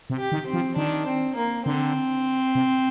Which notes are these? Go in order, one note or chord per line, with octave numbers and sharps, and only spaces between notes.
C3
G4
D#3
C4
F3
D#3 D4
C4
A#3
D3 C4
C3